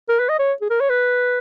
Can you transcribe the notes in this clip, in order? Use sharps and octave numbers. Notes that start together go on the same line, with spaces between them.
A#4
B4
D#5
C#5
G#4
A#4
C#5
B4